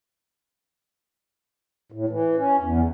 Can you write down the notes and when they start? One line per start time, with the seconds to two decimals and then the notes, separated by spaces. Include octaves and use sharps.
1.92 A2
2.09 E3
2.37 C#4
2.60 E2